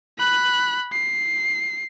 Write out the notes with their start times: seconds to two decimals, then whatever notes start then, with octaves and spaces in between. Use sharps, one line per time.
0.18 B5 F#6
0.92 C7